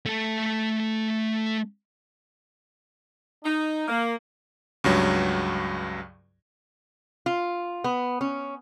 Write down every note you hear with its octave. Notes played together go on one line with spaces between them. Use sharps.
A3 A4
D#4
A#3
C#2 G2 F#3
F4
B3
C#4